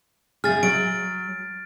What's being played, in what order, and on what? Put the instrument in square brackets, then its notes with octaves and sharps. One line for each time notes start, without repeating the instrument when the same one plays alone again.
[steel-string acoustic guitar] F#2 C#3 G#4 [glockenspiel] F6 A6
[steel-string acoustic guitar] F#3 [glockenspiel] D7